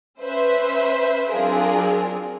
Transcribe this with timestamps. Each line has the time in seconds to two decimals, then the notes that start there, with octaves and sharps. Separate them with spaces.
0.21 C#4 B4 C5 E5
1.28 F#3 C4 D4 F4 G#4 A#4